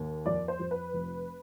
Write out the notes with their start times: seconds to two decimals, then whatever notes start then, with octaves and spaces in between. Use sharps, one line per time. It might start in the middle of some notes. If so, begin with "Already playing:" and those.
Already playing: D#2
0.26 F2 D5
0.48 C5
0.60 F2
0.71 B4
0.94 F1